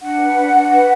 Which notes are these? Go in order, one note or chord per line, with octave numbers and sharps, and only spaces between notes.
D4 F#5
B4
D4
D4
B4